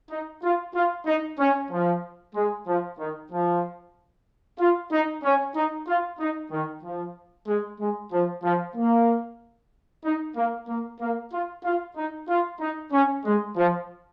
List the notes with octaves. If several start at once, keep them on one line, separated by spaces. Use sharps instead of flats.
D#4
F4
F4
D#4
C#4
F3
G#3
F3
D#3
F3
F4
D#4
C#4
D#4
F4
D#4
D#3
F3
G#3
G#3
F3
F3
A#3
D#4
A#3
A#3
A#3
F4
F4
D#4
F4
D#4
C#4
G#3
F3